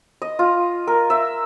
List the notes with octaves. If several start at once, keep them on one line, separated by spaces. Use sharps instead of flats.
D#5
F4
A#4
E5